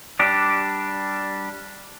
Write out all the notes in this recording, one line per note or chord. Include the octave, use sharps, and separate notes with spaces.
G3 D4 G4